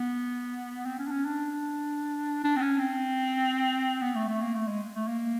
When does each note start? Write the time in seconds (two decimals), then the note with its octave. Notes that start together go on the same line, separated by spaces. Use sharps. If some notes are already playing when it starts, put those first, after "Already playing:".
Already playing: B3
0.86 C4
0.99 C#4
1.07 D4
1.12 C#4
1.25 D4
2.44 D4
2.57 C4
2.62 C#4
2.79 C4
4.02 B3
4.15 A3
4.28 A3
4.42 A#3
4.55 A3
4.68 G#3
4.95 A3
5.08 A#3